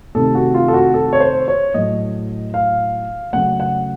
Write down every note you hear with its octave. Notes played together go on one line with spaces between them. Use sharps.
C3 D#3 A3 A4
F#4
F4
A4
F#4
A4
C#5
C5
C#5
A2 F#3 A3 D#5
F5
C#3 F#3 A3 F#5
F#5